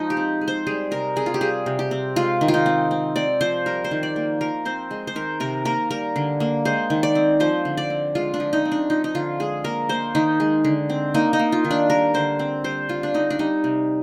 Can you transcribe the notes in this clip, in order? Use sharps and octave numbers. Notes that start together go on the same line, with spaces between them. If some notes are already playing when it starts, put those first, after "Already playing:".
Already playing: F3 G#3 D#4
G4
C4
G#3
C5
G3 G#4
C3 A#4
C4 G#4
F4
G4
G3 G#4
C3
G4
C4
G#3 F4
D#3
F4
D#4
C4
C4
C4 D5
F3 C5
G3 A#4
C5
D#3
D5
A#3
F3 A#4
C4 C5
G#3
C5
D#3 A#4
C3 A#4
A#3 A#4
G3 A#4
D3
A#3
G#3 C5
D#3
D5
C4
F3 C5
D3
D5
C4
G#3 F4
D4
F3
D#4
C4
D4
F3 D#4
D#4
D3 F4
G#3 G#4
A#3 A#4
A#3 C5
D#3 D#4
G#3
D3
C4
A#3 D#4
D#4
A#3
F4
D#3
D4
G3 A#4
D3 C5
C4
G3 C5
D3 F4
D4
C4 D#4
D4
G3 D#4
C3